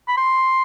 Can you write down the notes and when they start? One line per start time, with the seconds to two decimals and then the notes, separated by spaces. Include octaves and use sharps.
0.08 B5
0.17 C6